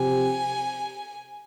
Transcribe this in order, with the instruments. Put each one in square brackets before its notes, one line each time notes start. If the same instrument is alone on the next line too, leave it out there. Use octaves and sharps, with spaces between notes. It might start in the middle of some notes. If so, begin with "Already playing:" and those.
Already playing: [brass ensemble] C3 F3 C4 G4 [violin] G#5